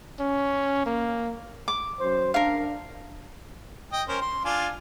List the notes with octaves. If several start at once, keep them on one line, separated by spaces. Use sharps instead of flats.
C#4
A#3
D6
F#2 C5
D4 A#4 F5
D#5 G5
C#4 A#4 C5
C6
D4 F4 G#5